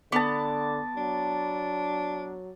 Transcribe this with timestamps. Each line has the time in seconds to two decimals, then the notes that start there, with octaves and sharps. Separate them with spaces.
0.12 D3 B3 A5 D6
0.97 F#3 D4